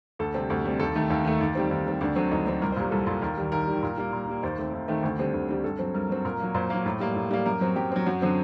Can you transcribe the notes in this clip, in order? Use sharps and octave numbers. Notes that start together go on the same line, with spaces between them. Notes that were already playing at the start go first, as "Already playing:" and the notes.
D2 A4
C3 G3 C4
D2
C3 G3 C4
D#2 A4
D#3 A3
D#2
D#3 A3
D#2
D#3 G3 C4
D#2
D#3 G3 C4
D2 D4
D3 F#3 C4
D2 D#4
D3 F#3 C4
C2 A#4
C5
A#2 G3 A#4
C2 A4
A#2 G3
D#2 A#4
D#3 G3
D#2 A#4
D#3 G3
A#2
G3 A#3
A#2
G3 A#3
D#2 C5
D#3 A3 C4
D#2
D#3 A3 C4
D2 C5
D3 G3 C4
D2
D3 G3 C4
G2 A4
F#3 C4
G2 A#4
F#3 C4
A#2 A#4
F#3 A#3
A#2 C5
F#3 A#3
A2
G3 A#3
A2
G3 A#3
F#2 A#4
F#3 C4
F#2 G4
F#3 C4
F#2 F#4
D3 F#3 C4